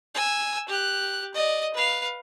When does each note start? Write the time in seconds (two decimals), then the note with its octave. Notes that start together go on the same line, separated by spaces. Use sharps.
0.14 G#5 E6
0.68 G4 F#6
1.34 D5 D#5
1.74 B4 F5